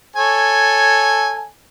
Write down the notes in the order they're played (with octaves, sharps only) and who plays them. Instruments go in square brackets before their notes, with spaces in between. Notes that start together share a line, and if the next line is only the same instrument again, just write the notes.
[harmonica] A4 C#5 G#5